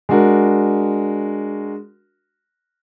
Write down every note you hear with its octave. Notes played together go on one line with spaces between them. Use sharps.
G#3 D4 F#4 A#4